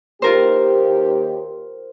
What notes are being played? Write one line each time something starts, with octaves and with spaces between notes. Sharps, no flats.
D#2 F4 G4 A#4 C5